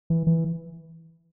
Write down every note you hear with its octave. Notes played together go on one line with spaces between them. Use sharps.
E3
E3